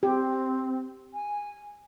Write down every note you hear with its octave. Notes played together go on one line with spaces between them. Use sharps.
C4 G4
G#5